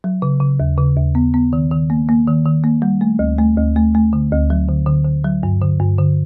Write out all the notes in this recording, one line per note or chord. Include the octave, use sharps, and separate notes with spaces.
F#3
C#3
C#3
D#2
C#3
D#2
B3
B3
D#3
D#3
A#3
A#3
D#3
D#3
A#3
G3
A3
D2
A3
D2
A3
A3
D3
D2
F#3
D3
D3
D3
F#3
G2
D3
G2
D3